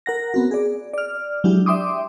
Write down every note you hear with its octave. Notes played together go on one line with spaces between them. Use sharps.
A#4 F#5 A#6
B3 C4 F#4
G#4 D5
D5 F6
F#3 G#3 D4 E4 G4
D5 E5 G5 C6 D6 D#6